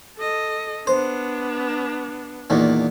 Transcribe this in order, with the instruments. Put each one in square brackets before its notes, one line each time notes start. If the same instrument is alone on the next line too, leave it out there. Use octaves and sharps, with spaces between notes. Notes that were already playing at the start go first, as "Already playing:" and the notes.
[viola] A4 D#5
[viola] B3 D4 [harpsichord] C5
[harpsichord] E2 A#2 D#3